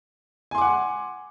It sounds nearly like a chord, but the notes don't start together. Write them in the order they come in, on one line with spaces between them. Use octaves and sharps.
G#5 C6 D6 F#5